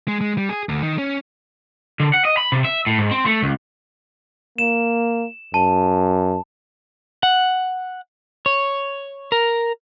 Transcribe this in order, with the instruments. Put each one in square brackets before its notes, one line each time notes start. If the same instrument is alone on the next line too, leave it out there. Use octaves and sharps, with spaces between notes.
[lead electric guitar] G#3
G#3
G3
G#4
D2
D#3
C#4
[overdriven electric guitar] D3
F#5
D#5
B5
C3
E5
A2
G#2
C4
A3
C#2
[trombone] A#3 [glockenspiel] E7
[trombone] F#2 [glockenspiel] A5
[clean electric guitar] F#5
C#5
A#4